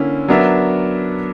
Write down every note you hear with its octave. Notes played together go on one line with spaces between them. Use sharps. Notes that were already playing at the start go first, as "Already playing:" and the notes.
Already playing: D3 A#3 C#4 E4
F#3 B3 D4 A#4 E5